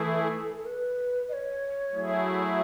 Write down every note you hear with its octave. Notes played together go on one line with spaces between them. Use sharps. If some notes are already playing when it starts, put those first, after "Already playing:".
Already playing: E3 A3 E4 G#4 A4
A4
B4
D#5
C#5
F#3 A3 E4 G#4